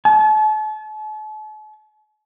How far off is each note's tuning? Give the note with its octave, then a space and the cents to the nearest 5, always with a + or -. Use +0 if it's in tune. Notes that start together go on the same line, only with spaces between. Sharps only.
A5 -40